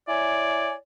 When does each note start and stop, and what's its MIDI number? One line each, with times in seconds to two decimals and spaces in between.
0.08 0.73 64
0.08 0.73 73
0.08 0.73 74
0.08 0.73 80